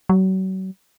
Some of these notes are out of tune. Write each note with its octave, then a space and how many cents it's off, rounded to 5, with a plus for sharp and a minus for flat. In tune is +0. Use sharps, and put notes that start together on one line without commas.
F#3 +35